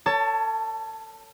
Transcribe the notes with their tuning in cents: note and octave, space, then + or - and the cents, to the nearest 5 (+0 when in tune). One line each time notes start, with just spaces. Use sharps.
A4 +40 C#5 +25 A5 +10